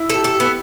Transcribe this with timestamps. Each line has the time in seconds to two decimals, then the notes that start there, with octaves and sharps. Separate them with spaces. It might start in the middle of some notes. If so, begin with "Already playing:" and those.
Already playing: E4
0.10 A4
0.15 G4
0.24 A4
0.35 G4
0.40 B3